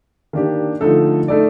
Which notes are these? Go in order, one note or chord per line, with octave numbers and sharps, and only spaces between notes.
D#3 A#3 D4 G4
D3 F3 A3 D#4 A4
A3 D#4 A4 D5